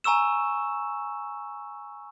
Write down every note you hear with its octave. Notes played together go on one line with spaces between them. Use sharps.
G#5 A#5 C#6 E6 E7